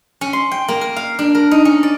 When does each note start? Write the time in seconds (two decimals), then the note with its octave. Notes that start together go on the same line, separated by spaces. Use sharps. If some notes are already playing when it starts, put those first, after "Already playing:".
0.21 C#4
0.33 C6
0.51 G5
0.68 A#3
0.81 A#4
0.96 F5
1.19 D4
1.35 A#4
1.51 D#4
1.65 C#4
1.83 D5